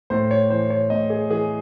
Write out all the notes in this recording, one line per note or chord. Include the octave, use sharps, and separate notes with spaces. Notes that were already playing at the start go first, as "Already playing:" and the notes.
A2 C5
C#5
E3 C5
C#5
A2 D#5
G#4
E3 G#4